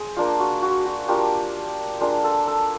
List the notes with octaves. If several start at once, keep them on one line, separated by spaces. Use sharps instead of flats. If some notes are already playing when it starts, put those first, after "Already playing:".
Already playing: G#4 C5
A#3 D4 F4
F#4
F#4
F#4
A#3 D4 F4 G4
A#3 D4 F4 G#4
A4
A4